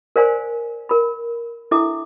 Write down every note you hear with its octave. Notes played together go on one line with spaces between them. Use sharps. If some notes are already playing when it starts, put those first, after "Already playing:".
A#4 C5 D5 F5 G#5 C6
A#4 B5
D4 E4 A4 E5 D6